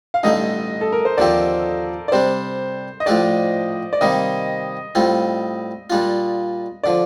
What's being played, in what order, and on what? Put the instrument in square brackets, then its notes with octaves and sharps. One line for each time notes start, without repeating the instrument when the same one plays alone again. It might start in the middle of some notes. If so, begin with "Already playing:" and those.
[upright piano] F5
[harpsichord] A1 G2 D3 A3 D#4 [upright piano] D#5
[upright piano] A4
A#4
C5
[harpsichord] D#2 D3 F3 C4 G4 [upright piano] D5
[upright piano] D5
[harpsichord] C3 G3 D4 [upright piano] C5
[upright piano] D#5
[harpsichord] A2 F3 A3 D4 G4 [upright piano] D5
[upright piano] D5
[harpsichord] C3 D#3 G3 A#3 [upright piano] D#5
[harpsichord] A2 G3 C4 F4
A#2 G3 D4 F4
[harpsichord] D3 F3 [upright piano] D5